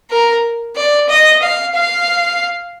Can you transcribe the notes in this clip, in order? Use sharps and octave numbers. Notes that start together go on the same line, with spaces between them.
A#4
D5
D#5
F5
F5